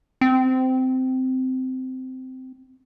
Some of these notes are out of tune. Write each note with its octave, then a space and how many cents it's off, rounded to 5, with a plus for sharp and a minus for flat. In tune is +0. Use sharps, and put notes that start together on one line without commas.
C4 -15